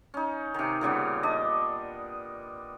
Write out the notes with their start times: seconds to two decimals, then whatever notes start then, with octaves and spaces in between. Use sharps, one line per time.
0.14 C#4 D#4
0.54 C3 D#3
0.81 A#2 C#3 G3 B3
1.23 D4 D#5